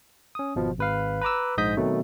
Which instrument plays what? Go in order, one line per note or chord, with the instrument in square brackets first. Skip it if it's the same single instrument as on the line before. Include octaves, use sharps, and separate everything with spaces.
[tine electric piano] C#4 D#6
G#1 B2 F3
G#1 B4 F5
B4 A#5 D6 E6
A#1 G#2 D#5 D#6 G6 B6
B2 D#3 F#3 A3 C4